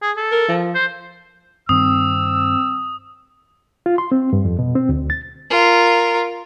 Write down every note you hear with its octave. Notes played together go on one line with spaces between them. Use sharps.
G#4
A4
A#4
F3
C5
G2 D#3 C4 D#6 E6
F4
C6
C4
G2
F2
B2
C4
D2
A6
F4 A#4